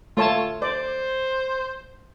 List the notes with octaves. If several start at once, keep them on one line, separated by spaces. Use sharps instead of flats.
A3 F4 C#5 A5
C5 D5